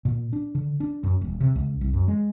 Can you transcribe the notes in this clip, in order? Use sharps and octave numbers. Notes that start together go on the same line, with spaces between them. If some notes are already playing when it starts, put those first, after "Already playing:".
A#2
D4
D3
D4
F#2
D#1
C3
C#2
C2
F#2
G#3